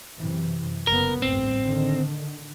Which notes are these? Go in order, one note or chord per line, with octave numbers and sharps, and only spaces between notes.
F#2 C3 E3
F#1 C#3 B3 A#4
A1 D2 G2 C4
D3 D#3